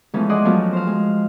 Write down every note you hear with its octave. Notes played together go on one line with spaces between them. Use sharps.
E3 F3 G#3 A3 B3 C#4
G#4 D5 D#5 F#5 C6
F3 F#3 A3 B3 C#4 F4
C5 F5
G#3